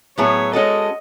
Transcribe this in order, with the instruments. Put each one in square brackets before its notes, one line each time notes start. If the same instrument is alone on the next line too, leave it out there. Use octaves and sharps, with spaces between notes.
[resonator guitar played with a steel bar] A2 F#3 B3 E4 G#4 [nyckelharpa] C#5
[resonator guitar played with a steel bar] G#3 C#4 F#4 A4 [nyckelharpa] D#5